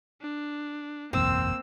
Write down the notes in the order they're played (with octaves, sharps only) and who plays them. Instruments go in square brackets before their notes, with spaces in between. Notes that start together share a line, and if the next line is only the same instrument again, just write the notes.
[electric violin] D4
[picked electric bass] F#1 B1 E2 [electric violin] A#3 E6 [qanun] C4